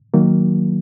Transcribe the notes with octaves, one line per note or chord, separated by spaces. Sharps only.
D#3 F#3 A#3